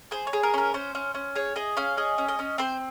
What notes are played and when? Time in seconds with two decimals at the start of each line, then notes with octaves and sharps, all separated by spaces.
0.11 G#4 C5
0.27 C#5
0.33 G#4
0.43 A#4
0.54 C#4 A#4
0.74 C#4 C5
0.95 C#4
1.15 C#4
1.35 G#4 C#5
1.56 G#4 D#5
1.77 C#4 F5
1.97 G#4 D#5
2.18 C#4
2.28 D#5
2.39 C#4
2.58 C4 C5